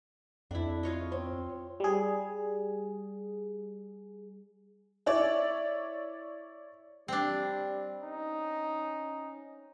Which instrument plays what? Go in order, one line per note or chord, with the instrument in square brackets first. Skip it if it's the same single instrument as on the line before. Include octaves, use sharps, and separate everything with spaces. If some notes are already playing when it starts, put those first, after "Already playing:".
[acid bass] F2 [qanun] D4 E4
[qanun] F4 C#5 D#5
[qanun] C4 [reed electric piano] C5 C#5
[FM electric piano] G3 G#4
[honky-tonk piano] E4 C#5 D5
[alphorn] G3 [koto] C4 D4
[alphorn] C#4 [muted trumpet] D#4